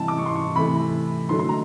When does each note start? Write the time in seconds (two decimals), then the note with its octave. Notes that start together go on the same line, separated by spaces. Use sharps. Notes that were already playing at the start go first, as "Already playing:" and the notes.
Already playing: C3 E3 G3 A5
0.08 D6
0.18 C#6
0.26 C6
0.35 C#6
0.55 C3 E3 A3 B5
1.29 D3 F#3 A3 C6
1.39 C6
1.49 A#5